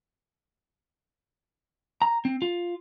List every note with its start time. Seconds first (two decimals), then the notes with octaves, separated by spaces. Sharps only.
2.02 A#5
2.25 C4
2.42 F4